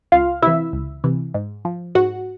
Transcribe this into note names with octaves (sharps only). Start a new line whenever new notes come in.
C#2 F4 F5
C3 E3 E4 E5
C#2
C3 E3
G#2
F3
G#2 F#4 F#5